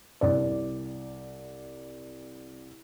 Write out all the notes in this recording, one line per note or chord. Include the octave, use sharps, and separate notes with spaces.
C2 D5